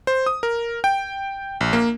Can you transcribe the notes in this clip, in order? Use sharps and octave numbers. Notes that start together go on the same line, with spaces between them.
C5
D#6
A#4
G5
A#1
A#3